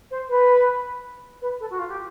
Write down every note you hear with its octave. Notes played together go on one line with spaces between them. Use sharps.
C5
B4
B4
A4
F#4
F4
G4